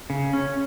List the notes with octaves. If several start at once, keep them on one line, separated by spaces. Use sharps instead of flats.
C#3
C#4